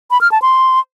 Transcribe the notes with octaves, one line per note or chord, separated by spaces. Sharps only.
B5
F6
A5
C6